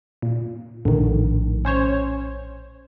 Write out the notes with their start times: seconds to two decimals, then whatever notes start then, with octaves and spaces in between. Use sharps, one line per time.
0.22 A#2
0.85 A#1 A2 D3 D#3
1.65 C#4 C5 C#5